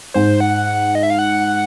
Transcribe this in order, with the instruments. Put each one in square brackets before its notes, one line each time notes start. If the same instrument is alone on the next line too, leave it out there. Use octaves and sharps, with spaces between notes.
[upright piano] G#2 [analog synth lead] C5
[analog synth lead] F#5
D#5
E5
F5
F#5